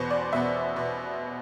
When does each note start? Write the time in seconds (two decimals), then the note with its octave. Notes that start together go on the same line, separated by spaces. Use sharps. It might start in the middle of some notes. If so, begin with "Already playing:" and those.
Already playing: E2 B2 B3 C5
0.11 D5
0.32 E2 B2 B3 E5
0.76 B2 B3